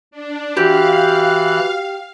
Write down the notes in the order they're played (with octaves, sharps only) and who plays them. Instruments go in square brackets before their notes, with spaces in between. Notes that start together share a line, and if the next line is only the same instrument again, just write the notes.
[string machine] D4
[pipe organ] E3 F#6 [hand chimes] F#4 [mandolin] G4 [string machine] F5